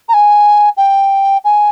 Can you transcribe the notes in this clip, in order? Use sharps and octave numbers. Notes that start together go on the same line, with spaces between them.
A#5
G#5
G5
G#5